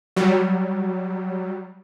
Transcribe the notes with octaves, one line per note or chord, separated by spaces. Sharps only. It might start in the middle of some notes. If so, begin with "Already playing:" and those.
F#3 G3